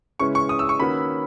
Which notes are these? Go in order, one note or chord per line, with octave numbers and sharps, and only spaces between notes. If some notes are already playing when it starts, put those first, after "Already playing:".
C#3 G#3 C#4 E4 B4 C#6
C#6
D#6
E6
C#6
D#3 A#3 C#4 F#4 B4 B5